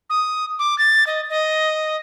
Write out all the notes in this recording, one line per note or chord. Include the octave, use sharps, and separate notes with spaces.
D#6
D6
A6
D#5
D#5